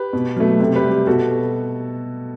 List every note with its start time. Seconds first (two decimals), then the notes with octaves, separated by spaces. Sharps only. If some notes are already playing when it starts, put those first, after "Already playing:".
Already playing: G4 B4
0.13 B2
0.36 F#3 A3
0.60 C3
0.76 G4 B4
0.84 G3
0.92 G4
1.07 B2 F#4 A4